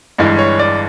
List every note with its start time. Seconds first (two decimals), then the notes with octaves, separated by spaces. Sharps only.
0.19 G1 G2 E3 G#3
0.39 C#5
0.59 D5